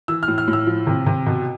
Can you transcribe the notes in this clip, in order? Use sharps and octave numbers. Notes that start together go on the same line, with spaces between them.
E3 E6
F6
A2
F6
A2
E6
F3
C3
C3
B2